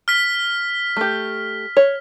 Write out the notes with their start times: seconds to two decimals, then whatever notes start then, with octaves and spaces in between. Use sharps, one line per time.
0.08 F6 B6
0.97 A3 G4
1.77 C#5